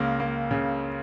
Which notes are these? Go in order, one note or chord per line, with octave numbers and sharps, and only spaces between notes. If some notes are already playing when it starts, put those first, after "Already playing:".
Already playing: C#2 C#3 A#3
A#3
C#3